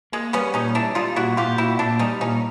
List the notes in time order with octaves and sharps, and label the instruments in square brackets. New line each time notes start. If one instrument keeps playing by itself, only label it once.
[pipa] G#3 [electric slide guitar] A#3
[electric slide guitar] G3 [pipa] B3 C#4
[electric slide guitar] A#2 [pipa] C#4 D#4
[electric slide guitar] G3 [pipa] D4 E4
[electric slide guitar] G3 [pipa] D#4 F4
[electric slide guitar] A#2 [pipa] E4 F#4
[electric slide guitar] A#2 [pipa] F4 G4
[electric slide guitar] A#2 [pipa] E4 F#4
[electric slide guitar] A#2 [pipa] D4 E4
[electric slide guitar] G3 [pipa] C#4 D#4
[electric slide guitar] A#2 [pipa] C#4 D#4